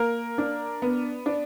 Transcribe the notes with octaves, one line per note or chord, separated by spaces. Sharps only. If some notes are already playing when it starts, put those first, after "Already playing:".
Already playing: A#3 A#4
D4
B3
D4